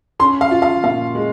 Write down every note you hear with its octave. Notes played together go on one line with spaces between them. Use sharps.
C#4 C6
F5
F4
F5
A#2 F5
G#3